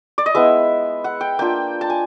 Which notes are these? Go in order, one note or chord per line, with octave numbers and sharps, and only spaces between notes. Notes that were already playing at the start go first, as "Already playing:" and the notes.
D5
D#5
G#3 B3 E4 E5
F#5
G5
A#3 D4 F4 G5
A5
G#5